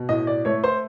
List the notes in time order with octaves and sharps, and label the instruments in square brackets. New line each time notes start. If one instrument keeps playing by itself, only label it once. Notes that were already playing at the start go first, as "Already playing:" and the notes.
Already playing: [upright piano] B2
A2 D#5
D5
A3 C#5
C5